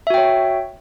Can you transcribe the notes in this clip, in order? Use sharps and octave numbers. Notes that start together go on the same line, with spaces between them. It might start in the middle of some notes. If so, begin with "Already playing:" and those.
F#4 C#5 E5 G5